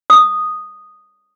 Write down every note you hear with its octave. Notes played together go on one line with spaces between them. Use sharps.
D#6